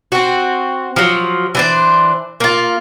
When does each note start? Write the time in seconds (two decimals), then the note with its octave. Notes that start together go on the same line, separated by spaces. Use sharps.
0.12 C4 F#4
0.96 F3 F#3
1.55 E3 D4 C5
2.40 A#3 F4